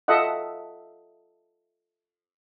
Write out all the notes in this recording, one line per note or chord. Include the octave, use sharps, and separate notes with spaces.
F4 A4 D#5 E5 F#5